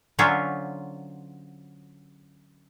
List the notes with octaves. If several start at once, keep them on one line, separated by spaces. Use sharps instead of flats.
D3 F#3 C#4 F4 C5 E5